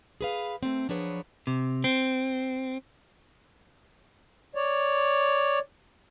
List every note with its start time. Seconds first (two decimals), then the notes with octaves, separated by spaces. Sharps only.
0.21 G#4 B4 F5
0.63 A3 C4
0.89 F3 F#3 D4 G#4 B4 C#5
1.47 C3
1.84 C4
4.55 C#5 D5